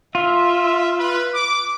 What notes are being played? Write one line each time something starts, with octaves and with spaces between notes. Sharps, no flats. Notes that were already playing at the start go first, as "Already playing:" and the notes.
F4 E5
B4
D6